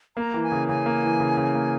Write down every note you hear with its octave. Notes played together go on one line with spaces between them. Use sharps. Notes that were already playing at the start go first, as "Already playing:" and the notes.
A#3 A#5
E3
G#5
C#3
C#3 G#5
A#3
E3
C#3
C#3
A#3